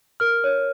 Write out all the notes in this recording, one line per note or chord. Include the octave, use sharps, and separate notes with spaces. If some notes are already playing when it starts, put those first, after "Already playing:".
A#4 F6
C#5